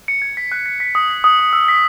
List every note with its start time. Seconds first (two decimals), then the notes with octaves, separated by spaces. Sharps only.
0.08 C#7
0.22 G#6
0.37 B6
0.52 F#6
0.66 B6
0.80 B6
0.95 D#6
1.10 B6
1.24 D#6
1.39 D#6
1.53 E6
1.68 B6